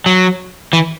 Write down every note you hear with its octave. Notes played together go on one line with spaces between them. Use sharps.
F#3
E3